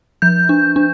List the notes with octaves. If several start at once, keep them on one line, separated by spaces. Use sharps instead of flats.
F3 G6
D4
D4